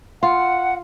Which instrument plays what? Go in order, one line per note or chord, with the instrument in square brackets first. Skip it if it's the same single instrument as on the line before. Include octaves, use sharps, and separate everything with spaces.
[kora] F4 [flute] F#5